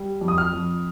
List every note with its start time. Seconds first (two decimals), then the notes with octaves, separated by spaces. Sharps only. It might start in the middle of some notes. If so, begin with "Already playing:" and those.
Already playing: G3
0.21 F2
0.28 D#6
0.38 F6
0.53 F2